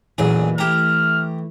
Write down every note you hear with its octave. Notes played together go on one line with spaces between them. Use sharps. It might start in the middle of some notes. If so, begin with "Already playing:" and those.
A1 E2 A#2 E3 F#3 G#4 D#5
A3 E4 G4 A#5 F6